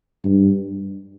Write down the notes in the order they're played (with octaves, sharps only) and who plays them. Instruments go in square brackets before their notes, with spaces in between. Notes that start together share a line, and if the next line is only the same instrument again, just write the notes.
[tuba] G2